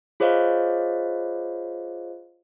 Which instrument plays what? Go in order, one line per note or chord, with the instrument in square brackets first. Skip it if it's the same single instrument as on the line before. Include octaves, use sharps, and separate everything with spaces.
[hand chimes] F4 G#4 C5 C#5 D#5 F5